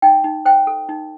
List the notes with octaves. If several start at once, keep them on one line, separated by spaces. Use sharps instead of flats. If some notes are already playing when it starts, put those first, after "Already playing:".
D#4 G5
D#4
C5 G5
A4
D#4